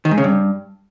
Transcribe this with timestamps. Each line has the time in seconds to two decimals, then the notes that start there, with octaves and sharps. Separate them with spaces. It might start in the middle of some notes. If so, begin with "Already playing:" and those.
0.05 D#3
0.11 G#2
0.18 C#3
0.24 G2